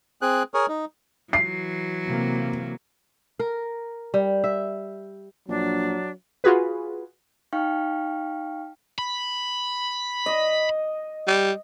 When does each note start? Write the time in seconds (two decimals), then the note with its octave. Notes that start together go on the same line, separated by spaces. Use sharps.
0.22 C4 G#4 F#6
0.54 G#4 A#4 C#5
0.68 D#4
1.33 E3 F#3 C7
2.07 C3 A#3
3.39 A#4
4.14 G3
4.44 E5
5.48 A#1 F#3 D4
6.44 F4 F#4 G#4 B4
7.53 D#4 F5 G5 C#6 F6
8.98 B5
10.26 D#5
11.28 G3